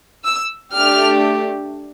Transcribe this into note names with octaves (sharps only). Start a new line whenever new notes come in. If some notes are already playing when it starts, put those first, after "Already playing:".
E6
A3 D4 G4 F6